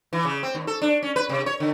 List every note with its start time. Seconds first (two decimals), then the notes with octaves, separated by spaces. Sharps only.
0.13 E3
0.25 C#3
0.43 C4
0.55 D#2
0.67 A4
0.82 D4
1.03 C#4
1.16 B4
1.29 C3
1.46 C#5
1.60 D3